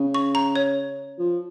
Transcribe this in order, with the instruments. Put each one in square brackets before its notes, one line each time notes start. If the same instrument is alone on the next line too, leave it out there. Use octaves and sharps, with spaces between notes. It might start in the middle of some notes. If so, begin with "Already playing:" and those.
Already playing: [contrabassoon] C#3
[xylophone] C#6
A#5
C#5
[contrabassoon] F3